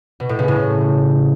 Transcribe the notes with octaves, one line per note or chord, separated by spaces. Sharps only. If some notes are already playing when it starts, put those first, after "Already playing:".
B2
A2
C#3
A2